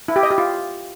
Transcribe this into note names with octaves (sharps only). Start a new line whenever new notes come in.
E4
G4
D#5
G4
F4